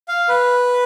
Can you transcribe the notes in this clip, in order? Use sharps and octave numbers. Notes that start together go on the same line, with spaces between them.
F5
B4